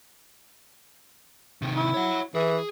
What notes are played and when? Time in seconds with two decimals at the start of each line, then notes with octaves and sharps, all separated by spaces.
1.62 C3 D#3
1.76 E4
1.94 C#5 F#5
2.35 E3 G#4